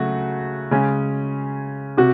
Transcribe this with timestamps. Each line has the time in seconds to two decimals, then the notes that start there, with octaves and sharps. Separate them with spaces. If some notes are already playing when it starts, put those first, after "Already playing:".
Already playing: C#3 F#3 A3 F#4
0.71 C#3 G#3 C#4
1.97 C3 F#4